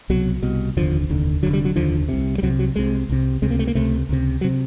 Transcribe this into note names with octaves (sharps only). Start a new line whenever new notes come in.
C2 B2 F#3
C2 B2
F1 D#2 D3 F3
F1 D#2 D3
F1 D#2 D3 F#3
G3
F#3
F1 D#2 D3 F3
C2 C3
G3
C2 C3 F#3
F#3
C2 C3 G#3
C2 C3
C#2 C3 G#3
A#3
A3
A#3
C#2 C3 A3
C#2 C3
F#3
C3